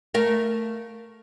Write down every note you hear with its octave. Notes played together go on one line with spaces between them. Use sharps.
A3 A#4 F5